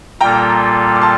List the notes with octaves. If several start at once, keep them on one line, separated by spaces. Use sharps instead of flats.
A#2 G3 A#3 F4 A4 G5 A#5
D6
A5 C6